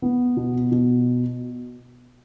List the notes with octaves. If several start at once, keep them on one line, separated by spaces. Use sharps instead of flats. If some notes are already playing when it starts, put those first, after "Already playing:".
B3
B2
B2